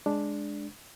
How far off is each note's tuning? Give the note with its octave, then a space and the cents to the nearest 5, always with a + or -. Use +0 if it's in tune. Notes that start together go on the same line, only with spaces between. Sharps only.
G#3 +0 D4 +0